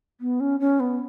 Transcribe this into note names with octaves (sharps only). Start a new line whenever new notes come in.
B3
C#4
C#4
B3